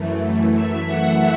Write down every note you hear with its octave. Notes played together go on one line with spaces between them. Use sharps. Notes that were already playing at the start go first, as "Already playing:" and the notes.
Already playing: F#2 E3 A3
E5
F#5